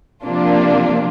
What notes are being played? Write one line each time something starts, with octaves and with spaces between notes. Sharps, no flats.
C3 F3 A#3 D4 F4